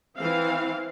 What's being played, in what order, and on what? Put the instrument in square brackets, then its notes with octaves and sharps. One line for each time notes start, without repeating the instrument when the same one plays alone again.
[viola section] E3 C4 F5